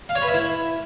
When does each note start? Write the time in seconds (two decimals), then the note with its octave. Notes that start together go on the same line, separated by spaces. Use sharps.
0.09 F5
0.15 C#5
0.22 B4
0.28 E5
0.34 E4